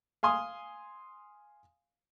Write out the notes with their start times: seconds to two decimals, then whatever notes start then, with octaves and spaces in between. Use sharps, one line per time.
0.23 F5 G#5 C6 D#6